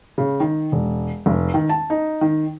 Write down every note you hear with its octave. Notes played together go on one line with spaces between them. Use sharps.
C#3
D#3
E1
F1
D#3
A5
D#4
D#3